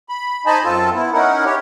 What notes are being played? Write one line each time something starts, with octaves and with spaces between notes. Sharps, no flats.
B5
D#4 C5 D#5 G#5 A5 B5
F#2 C4 F4 A4 A5
B3 E4
C#4 D#4 E4 A#4 F#5
G4 C#5